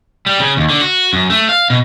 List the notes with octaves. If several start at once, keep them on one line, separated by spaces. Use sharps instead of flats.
G3
C#3
D#2
D3
F#4
F#2
A3
F5
B2